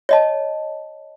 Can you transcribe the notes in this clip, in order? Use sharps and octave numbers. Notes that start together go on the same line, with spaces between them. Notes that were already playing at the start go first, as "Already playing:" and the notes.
C#5 D#5 A5